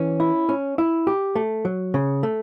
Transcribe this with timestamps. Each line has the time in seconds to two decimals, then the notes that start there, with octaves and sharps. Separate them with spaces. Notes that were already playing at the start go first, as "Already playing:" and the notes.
Already playing: E3 C#4
0.20 E4
0.49 C#4
0.78 E4
1.07 G4
1.36 A3
1.65 F#3
1.94 C#3
2.23 A3